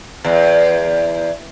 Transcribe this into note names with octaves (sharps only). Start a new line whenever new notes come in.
E2